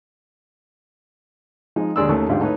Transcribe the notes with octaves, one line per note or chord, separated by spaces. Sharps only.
F3 G#3 D#4
D#2 D3 G#3 D5 C6 E6
D#2 D#3 A3 C#4
A1 G#2 D3 F4 F5 G5
A3 D#4 E4 B4 C#5